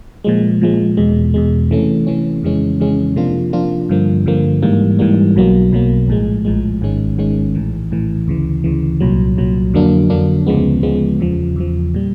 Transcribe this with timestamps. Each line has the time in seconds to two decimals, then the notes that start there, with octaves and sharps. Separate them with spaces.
0.24 A#2 F3 G#3
0.61 A#2 F3 G#3
0.97 E2 B2 G#3
1.34 E2 B2 G#3
1.71 C3 E3 A3 C#4
2.07 C3 E3 A3 C#4
2.43 F2 C#3 E3 G#3 C#4
2.80 F2 C#3 E3 G#3 C#4
3.16 C3 F3 A#3 D4 F4
3.53 C3 F3 A#3 D4 F4
3.89 G2 D3 F3 A#3
4.26 G2 D3 F3 A#3
4.62 G#2 E3 G3 A#3
4.99 G#2 E3 G3 A#3
5.36 B1 B2 F#3 A#3
5.72 B1 B2 F#3 A#3
6.08 A#1 A2 F3 G#3
6.45 A#1 A2 F3 G#3
6.81 G#1 G#2 D#3 G#3 C#4
7.18 G#1 G#2 D#3 G#3 C#4
7.55 A#1 A2 E3
7.91 A#1 A2 E3
8.28 D2 C#3 E3
8.64 D2 C#3 E3
9.00 C2 A#2 F#3
9.37 C2 A#2 F#3
9.74 F2 D3 F#3 A#3 D4
10.10 F2 D3 F#3 A#3 D4
10.47 D2 C#3 F3 G#3 B3
10.83 D2 C#3 F3 G#3 B3
11.20 E2 C#3 F3
11.56 E2 C#3 F3
11.94 A#2 G3